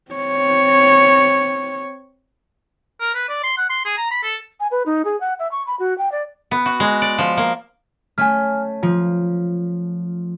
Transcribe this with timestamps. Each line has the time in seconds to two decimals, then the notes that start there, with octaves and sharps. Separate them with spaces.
0.11 C4 C#5
3.00 A#4
3.14 B4
3.29 D5
3.44 C6
3.57 F#5
3.70 C6
3.85 G#4
3.98 A#5
4.11 B5
4.23 A4
4.60 G#5
4.71 B4
4.86 D#4
5.05 G#4
5.20 F#5
5.39 E5
5.51 C#6
5.67 B5
5.79 F#4
5.98 G5
6.12 D5
6.51 B3
6.66 F#4
6.80 G#3
7.02 D5
7.18 F3
7.37 A#3
8.18 A3 C#4 G#5 F6
8.83 F3 F4